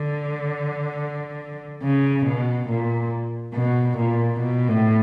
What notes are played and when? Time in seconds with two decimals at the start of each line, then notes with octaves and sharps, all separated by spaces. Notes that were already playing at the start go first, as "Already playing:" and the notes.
Already playing: D3
1.83 C#3
2.26 B2
2.68 A#2
3.54 B2
3.97 A#2
4.40 B2
4.68 A2